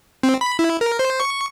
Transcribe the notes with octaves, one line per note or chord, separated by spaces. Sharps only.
C4
B5
E4
A#4
C5
C#6